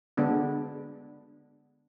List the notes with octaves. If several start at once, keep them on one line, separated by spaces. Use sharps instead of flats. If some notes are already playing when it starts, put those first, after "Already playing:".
D3 G#3 B3 D4